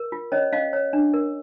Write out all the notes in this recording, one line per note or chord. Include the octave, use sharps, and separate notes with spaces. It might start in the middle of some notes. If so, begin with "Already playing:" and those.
Already playing: A#4
F4
C#4 C#5 D#5
C#4 D#5 F5
C#5
D4
A#4